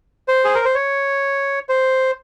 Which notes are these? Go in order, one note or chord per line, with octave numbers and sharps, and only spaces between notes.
C5
G#4
A#4
C5
C#5
C5